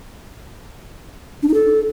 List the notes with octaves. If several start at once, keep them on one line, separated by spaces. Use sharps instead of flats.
D4
D#4
A4